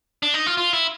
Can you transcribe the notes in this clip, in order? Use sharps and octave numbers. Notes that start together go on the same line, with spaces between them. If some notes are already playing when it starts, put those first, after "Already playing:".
D4
D#4
F4
F4
E4